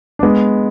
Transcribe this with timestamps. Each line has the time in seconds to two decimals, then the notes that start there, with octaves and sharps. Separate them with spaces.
0.19 D4
0.23 G#3 B3